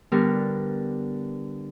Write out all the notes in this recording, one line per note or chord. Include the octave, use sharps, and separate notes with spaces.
D3 G3 B3 D4 A#4